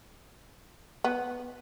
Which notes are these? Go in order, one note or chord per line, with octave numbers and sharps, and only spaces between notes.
B3